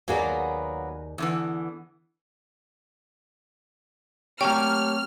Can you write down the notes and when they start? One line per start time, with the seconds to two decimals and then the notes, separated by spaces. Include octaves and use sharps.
0.08 D#2 F#3 A#3 B3 G#4 D5
1.18 E2 D3 E3
4.41 F#3 A3 A#3 C4 G4 C#5 G5 F6